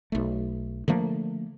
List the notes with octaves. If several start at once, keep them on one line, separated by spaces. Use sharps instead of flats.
B1 A3
D3 F3 A3 A#3